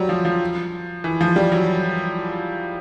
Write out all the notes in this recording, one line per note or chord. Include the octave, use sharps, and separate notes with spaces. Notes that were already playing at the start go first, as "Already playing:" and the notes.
Already playing: F#3 G3
F3
F3
E3
F3
G3
F#3